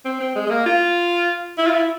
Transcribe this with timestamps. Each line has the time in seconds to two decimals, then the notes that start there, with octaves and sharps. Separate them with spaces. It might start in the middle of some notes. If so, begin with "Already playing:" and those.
0.05 C4
0.20 C4
0.36 G#3
0.47 G#3
0.50 A#3
0.66 F4
1.58 E4
1.67 F4
1.74 E4